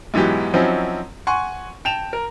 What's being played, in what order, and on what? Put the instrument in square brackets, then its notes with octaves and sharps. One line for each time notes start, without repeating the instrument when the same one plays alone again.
[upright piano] G#2 E3 F#3 B3 G4
F3 F#3 C4 C#4 D#4 E4
F#5 G#5 C6 C#6
G5 A5 E7 F7
A#4